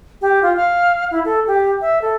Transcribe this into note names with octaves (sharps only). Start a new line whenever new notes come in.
G4
F4
F5
E4
A4
G4
E5
A4